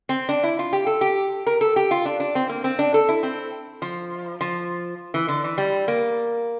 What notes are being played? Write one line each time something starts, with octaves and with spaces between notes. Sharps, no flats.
C4
D4
E4
F4
G4
A4
G4
A#4
A4
G4
F4
D4
D4
C4
A#3
C4
D4
A4
E4
C4
F3
F3
E3
D3
E3
G3
A#3